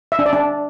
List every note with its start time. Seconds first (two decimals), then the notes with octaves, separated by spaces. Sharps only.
0.12 E5
0.19 D4
0.26 D5
0.33 D4